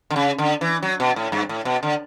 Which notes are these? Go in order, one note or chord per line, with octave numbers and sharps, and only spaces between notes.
D3
C#3
D3
E3
F#3
B2
A2
G2
A2
B2
D3